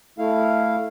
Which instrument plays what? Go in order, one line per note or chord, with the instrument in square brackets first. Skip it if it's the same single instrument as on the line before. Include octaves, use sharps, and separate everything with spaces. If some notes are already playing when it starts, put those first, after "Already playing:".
[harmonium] A3 E4 F5